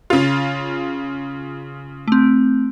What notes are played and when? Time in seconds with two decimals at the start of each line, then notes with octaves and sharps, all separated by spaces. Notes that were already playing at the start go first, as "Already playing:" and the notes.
0.10 C#3 F4
2.08 A3 C4